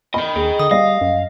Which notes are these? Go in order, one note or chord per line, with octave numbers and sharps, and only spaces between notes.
D#5 G5 B5
D#2 G#4
D3 D#6
G3 D#5 F5 A#6
F#2